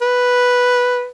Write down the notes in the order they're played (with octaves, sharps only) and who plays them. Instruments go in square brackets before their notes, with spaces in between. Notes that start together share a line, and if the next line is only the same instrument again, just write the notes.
[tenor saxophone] B4